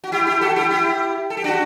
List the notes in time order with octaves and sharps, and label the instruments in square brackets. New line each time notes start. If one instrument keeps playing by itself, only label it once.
[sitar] F#4
E4 G4
E4 G4
F#4 A4
E4 G4
E4 G4
A4
G4
D4 F#4